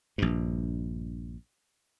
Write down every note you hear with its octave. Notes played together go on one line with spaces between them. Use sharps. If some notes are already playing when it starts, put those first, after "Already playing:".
A#1 G2